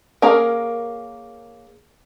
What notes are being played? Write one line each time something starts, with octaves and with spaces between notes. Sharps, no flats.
A#3 C#4 G#4 A#4 A#5